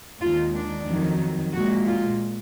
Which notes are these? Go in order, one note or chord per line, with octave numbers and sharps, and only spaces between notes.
D#2 D#3 G#3 F4
D4
F2 D#3 F#3
A#2 G#3 F#4
F4